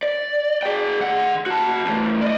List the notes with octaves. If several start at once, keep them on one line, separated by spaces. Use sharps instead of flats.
D5
G#4 G5
D#3 F#5
F#4 A5
E2 A2
D5 D#5